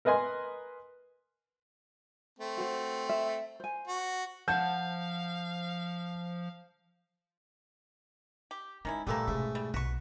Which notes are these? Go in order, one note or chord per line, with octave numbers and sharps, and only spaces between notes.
A#4 B4 D#5 G#5 C6
A3 C4
F#4 C5
E5
C5 G#5
F#4
F3 F5 F#5 A5 G6
G4
D#3 G#3 C#4 E4
A#2 D3 E3 G3 A3 A#3 A4
G#2 B2 A3 C#4
G3
B1 F#4 B4 C#6